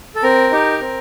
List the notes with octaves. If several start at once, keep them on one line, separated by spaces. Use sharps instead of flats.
A4
C4 A#4
D#4 G4
C4